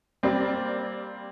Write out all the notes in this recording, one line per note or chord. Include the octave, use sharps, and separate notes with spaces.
G3 A#3 C4 D5